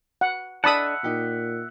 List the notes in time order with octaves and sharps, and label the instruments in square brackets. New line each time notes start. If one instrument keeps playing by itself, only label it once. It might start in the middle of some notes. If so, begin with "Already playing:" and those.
[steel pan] F#5
[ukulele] D4 A4 D#5 [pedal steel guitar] E5 F#5 [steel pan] A5 B5 D#6
[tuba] A#2 [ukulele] D#4 G4